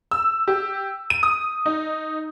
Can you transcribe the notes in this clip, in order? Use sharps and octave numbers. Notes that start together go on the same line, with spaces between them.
E6
G4
D#7
D#6
D#4